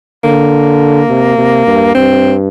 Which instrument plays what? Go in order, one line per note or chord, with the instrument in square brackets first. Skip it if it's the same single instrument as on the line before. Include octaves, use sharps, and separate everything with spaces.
[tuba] D3 [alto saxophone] A#3
[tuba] C3
C3
G2
[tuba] G2 [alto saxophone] C4